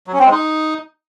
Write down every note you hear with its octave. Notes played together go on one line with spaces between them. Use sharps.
F#3
C#4
C4
G#3
D#4